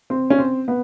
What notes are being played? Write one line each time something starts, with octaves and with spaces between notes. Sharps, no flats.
C4
C#4
C4
B3